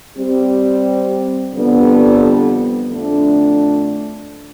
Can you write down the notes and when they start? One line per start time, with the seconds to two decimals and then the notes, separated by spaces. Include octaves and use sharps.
0.18 G3 C4 G4
1.53 F2 D3 G3 B3
2.90 F2 D3 A3 D4